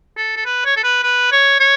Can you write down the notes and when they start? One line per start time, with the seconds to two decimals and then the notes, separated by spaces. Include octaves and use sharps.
0.17 A4
0.36 A4
0.45 B4
0.65 C#5
0.77 A4
0.83 B4
1.03 B4
1.32 C#5
1.60 C#5